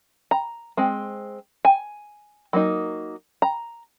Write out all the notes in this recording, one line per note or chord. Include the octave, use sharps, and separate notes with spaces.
A#5
G#3 C4
G#5
F#3 A#3 D#4
A#5